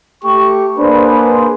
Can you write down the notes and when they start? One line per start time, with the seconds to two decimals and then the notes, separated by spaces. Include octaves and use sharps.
0.24 A3 G4 C#6
0.79 A#3 D4 G#4 B4 C5